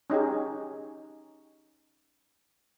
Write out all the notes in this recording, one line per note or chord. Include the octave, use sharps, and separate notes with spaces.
C#4 D#4 G4 G#4